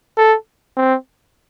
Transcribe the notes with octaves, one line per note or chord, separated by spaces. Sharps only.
A4
C4